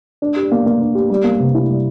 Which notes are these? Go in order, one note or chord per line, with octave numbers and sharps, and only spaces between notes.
D4
G4
A#3
A#3
D4
G4
G3
A#3
C3
E4
G3